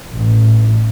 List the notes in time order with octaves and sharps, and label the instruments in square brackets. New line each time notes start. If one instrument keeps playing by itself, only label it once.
[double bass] A1